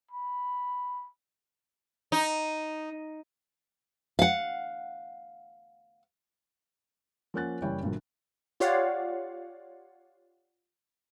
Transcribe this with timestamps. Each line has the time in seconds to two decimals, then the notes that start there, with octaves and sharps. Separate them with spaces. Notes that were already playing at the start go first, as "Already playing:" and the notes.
0.11 B5
2.12 D#4
4.19 F5 F#5
7.34 F3 A#3 C#4 F#5 F#6 A6
7.62 F#1 E3 G3 C#5 G5
7.83 G1 A#2 F#3
8.60 F4 G4 C#5 D5 F5 F#5